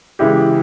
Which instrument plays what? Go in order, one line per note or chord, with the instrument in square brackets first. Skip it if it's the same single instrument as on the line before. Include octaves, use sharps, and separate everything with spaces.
[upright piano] C#3 E3 G#3 E4 G4